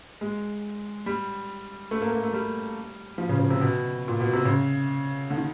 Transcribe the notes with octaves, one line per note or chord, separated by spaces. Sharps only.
G#3
G3
A3
A#3
A#3
A3
G3
F3
C#3
C#3
C3
B2
A#2
B2
C3
C#3
D3
D#3